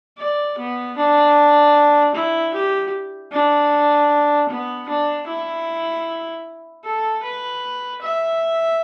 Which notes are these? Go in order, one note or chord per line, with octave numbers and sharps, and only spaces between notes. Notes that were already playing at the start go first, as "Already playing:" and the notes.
D5
B3
D4
E4
G4
D4
B3
D4
E4
A4
B4
E5